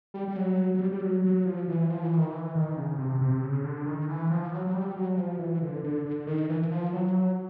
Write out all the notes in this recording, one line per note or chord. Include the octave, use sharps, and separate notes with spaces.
G3
G3
F#3
F#3
G3
G3
F#3
F#3
F3
E3
F3
E3
D#3
E3
D#3
C#3
C3
C3
C#3
D3
D#3
E3
F3
F#3
F#3
G3
F#3
F3
E3
D3
D3
D3
D#3
E3
E3
F3
F#3